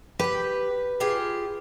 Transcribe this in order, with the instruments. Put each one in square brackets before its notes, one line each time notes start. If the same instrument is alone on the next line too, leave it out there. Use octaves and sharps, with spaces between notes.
[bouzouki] G4 G5 [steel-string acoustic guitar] B4
[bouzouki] F4 G4 G#4